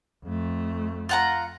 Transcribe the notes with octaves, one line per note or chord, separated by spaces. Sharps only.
F2 A3
F4 F#5 A#5